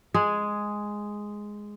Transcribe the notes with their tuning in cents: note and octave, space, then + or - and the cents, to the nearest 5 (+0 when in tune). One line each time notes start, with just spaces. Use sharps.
G#3 +0 G#4 +0